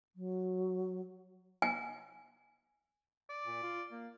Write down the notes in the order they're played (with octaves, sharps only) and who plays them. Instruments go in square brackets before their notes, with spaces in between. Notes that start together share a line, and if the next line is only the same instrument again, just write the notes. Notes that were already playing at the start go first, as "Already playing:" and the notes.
[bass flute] F#3
[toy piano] G#5
[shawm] D5
[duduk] A#2
F4
A#3